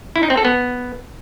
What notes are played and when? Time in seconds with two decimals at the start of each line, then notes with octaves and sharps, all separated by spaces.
0.16 E4
0.23 D#4
0.30 C4
0.37 A4
0.45 B3